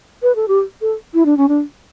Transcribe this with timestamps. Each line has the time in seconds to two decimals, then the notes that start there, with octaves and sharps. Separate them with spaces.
0.23 B4
0.36 A4
0.48 G4
0.81 A4
1.14 E4
1.26 D4
1.37 C#4
1.48 D4